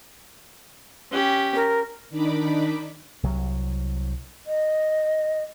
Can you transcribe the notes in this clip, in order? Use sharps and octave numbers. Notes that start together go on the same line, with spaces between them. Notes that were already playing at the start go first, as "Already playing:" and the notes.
C#4 G4
A#4
D#3 D4 D#4 B5 D6
C2 F#3
D#5